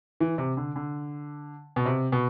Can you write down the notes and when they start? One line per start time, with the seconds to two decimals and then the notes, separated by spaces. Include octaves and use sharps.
0.20 E3
0.38 C3
0.57 D3
0.76 D3
1.76 B2
1.86 C3
2.12 B2